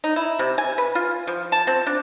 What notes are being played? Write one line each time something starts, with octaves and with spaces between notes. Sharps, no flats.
D#4
E4
C3
G#5
B4
F4
F3
A5
C4
D4